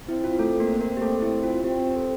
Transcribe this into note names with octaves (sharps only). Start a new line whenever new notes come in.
C4 E4
F4
A3 A4
A#3 A#4
C5
A#3 A#4
G4
A3 A4
E4
F4
F4
C4 G4
A4